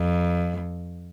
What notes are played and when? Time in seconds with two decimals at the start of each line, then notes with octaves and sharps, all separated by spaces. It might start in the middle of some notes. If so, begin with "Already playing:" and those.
Already playing: F2